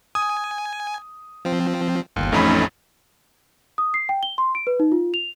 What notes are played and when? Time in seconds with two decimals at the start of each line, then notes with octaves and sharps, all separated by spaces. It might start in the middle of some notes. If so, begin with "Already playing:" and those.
0.15 G#5 D#6
1.45 F3 C4
2.16 G1 D#2
2.32 A1 F2 A3 C#4 D#4 B5
3.78 D#6
3.94 C7
4.09 G5
4.23 G7
4.38 C6
4.55 D7
4.67 B4
4.80 D#4
4.92 F4
5.14 F7